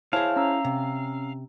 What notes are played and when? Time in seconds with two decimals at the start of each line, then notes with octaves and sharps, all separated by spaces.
0.13 E4 G#4 C5 C#5 F5 A5
0.36 C#4 A#5 E6
0.64 C3